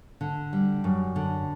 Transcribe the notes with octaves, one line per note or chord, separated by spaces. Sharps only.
D3
G3
F#2
D3